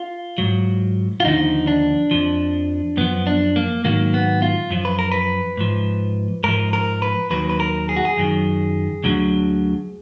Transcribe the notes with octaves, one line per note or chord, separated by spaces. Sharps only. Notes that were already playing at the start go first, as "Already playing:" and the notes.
Already playing: F4
G#2 F#3
F4
D#2 D3 F3 D#4
D4
F2 F3
F#2 F3 B3
D4
A#3
G#2 D#3 F#3 A#3
B3
F4
F#2 F3
B4
A#4
B4
G#2 F3
G#2 F3 A#4
A#4
B4
D#2 D#3 F#3 B4
B4
A#4
G#4
F#4
G#4
F#2 D#3 F#3
D2 D3 F#3